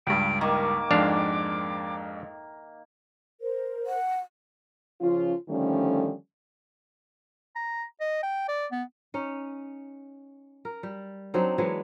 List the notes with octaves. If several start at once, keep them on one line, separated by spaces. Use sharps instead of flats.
C#2 G2 D7
D#3 A#3 C#6 D6
F2 G#2 D4 F5
A#4 C5
F#5
C#3 F3 C#4 F4
D3 D#3 F3 G3 A3 C#4
A#5
D#5
G5
D5
B3
C#4 D#4
A#4
G3
F#3 C4 D4 D#4
E3 F#3 G#3 B3